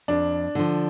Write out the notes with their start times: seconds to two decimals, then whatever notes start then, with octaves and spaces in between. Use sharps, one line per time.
0.08 F2 D4
0.55 D3 F3